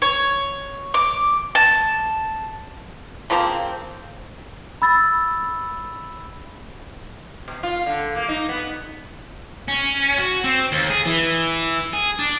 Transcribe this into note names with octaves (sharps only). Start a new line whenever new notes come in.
C#5
D6
A5
C#3 F3 A#3 C4
B5 E6 A6
B2
F4
D3
A#3
D#4
B3
C#4
F#4
C4
D#2
G#4
E3
G#4
D4